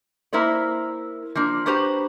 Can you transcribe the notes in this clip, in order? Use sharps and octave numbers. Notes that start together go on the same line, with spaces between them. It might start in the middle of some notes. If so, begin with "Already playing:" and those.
A#3 E4 A#4 C5 D5
F3 A#3 D4 D5
D4 F#4 G4 B4 C5 A#5